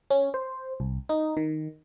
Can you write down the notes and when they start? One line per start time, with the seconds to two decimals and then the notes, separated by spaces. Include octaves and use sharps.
0.10 C#4
0.34 C5
0.80 C2
1.09 D#4
1.37 D#3